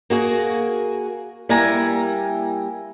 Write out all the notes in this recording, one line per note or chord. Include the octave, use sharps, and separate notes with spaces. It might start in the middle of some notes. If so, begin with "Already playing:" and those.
A#3 F#4 G#4
G3 A#3 E4 G#5 A#5